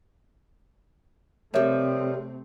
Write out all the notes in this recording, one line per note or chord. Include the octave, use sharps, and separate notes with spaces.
C3 F3 G3 A3 C4 A#4 C#5 E5